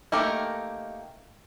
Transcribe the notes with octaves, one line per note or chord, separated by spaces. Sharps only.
A3 A#3 D#4 G4 A#4